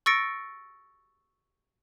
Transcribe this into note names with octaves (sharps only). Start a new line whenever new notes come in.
C#6 E6 A6 A#6 C#7 D7